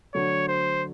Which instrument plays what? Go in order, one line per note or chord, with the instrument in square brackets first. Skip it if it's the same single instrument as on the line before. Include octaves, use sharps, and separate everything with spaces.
[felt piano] D3 F#3 A3 [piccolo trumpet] C#5
[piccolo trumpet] C5